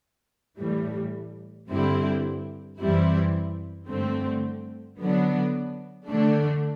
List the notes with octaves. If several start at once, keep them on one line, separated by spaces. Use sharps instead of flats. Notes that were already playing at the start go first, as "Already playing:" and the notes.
A2 E3 G3
G2 D3 G3 C4 E4
F#2 E3 G3 C4 E4
G2 D3 A3 C4
D3 F#3 B3 D4
D3 A3 D4